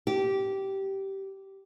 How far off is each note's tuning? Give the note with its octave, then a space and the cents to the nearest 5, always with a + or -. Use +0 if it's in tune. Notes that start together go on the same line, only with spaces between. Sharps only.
G4 -15